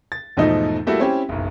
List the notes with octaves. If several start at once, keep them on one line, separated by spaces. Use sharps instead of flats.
A6
E2 G#2 B2 F3 A3 D#4
G3 A3 A#3 E4 F#4
C4 C#4 E4 G4
F#1 B1